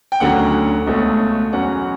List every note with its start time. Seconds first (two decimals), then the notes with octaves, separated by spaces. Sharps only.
0.12 G5
0.20 D2 D3 F#3 C#4 F#5
0.87 C#2 B2 A3 C#4
1.53 E2 B2 F#3 C#4 F#5